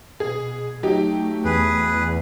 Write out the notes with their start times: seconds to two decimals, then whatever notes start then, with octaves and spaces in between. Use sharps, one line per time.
0.20 B2 G#4
0.83 F#3 A3 D#4 G4
1.45 E2 G#4 B4